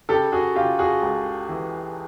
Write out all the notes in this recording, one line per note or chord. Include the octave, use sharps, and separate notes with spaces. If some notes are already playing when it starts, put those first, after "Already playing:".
C#3 G4 A4
F#4 G#4
C#3 F4 G4
F#4 G#4
C#2
E3